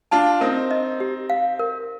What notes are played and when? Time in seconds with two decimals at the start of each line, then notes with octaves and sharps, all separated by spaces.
0.11 D4 F4 A5
0.41 C4 D#4 A#4
0.71 D#5
1.00 G4
1.30 F5
1.59 A#4